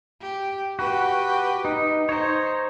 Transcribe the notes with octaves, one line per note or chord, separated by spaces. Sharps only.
G4
F#4 G4 B4
D#4
D#4 C5 C#5